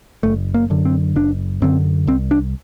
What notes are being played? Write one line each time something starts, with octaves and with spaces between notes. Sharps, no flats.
F#1 A3
A#3
F#2 D3
C4
F#1 D4
F#2 D3 C4
C2 C4
D4